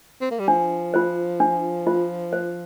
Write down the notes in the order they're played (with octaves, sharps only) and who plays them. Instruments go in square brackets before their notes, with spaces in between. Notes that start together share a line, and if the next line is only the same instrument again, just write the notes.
[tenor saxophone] C4
A#3
G3
[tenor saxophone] F3 [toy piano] D4
[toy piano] F4 C5
D4
F4 C5
C5